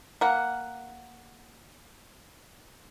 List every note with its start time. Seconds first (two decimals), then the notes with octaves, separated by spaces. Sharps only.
0.21 A#3 F#5